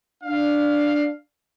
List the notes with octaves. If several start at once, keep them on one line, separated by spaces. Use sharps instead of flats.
D4 F5